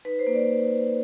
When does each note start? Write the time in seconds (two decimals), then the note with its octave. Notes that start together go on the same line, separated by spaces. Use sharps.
0.05 D#4 B4
0.19 C5
0.27 A#3
0.34 D5